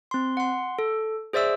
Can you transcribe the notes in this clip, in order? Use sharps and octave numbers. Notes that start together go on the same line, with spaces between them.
C4 C6
F#5 C6
A4
G#4 C5 D5 E5 E6